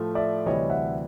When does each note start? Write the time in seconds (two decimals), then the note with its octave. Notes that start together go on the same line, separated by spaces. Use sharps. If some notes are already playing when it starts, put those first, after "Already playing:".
Already playing: A2 F3 A3
0.15 D5 E5
0.46 D2 C3 E3 G3 C#5 D#5
0.70 E5 F#5